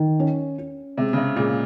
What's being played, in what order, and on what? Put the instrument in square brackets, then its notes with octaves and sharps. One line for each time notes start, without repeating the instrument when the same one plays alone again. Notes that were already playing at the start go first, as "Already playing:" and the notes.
Already playing: [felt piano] D#3
C#4
C#4
[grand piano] C3 [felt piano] G#3
[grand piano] C#3
C3
[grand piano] A#2 [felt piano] G#3